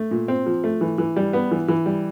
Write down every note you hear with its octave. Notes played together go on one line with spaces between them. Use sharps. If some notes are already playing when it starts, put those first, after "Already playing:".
Already playing: A3
A#2
C4
F3
A3
E3
E3
G3
B3
E3
E3
G3